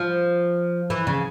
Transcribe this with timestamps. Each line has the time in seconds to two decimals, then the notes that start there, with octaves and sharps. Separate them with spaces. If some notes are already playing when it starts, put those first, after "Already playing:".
Already playing: F3
0.90 E3
1.07 C#3